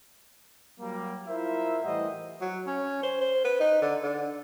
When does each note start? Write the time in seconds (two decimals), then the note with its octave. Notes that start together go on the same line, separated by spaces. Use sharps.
0.80 F#3 G3 A#3
1.28 E4 F4 A#4 C5 E5
1.84 A2 E3 G3 C5 D#5 F#5
2.41 F#3
2.67 C#4
3.03 C5
3.21 C5
3.44 B4
3.60 D#4
3.82 D3
4.03 D3